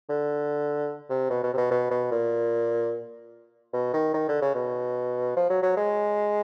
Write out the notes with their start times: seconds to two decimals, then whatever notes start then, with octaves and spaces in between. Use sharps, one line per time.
0.09 D3
1.09 C3
1.30 B2
1.43 B2
1.53 C3
1.57 B2
1.71 B2
1.91 B2
2.11 A#2
3.73 B2
3.93 D#3
4.14 D#3
4.28 D3
4.42 C#3
4.55 B2
5.36 F3
5.50 F#3
5.62 F#3
5.77 G#3